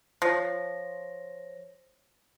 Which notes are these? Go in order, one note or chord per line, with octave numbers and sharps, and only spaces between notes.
F3 C5 C#5 A#6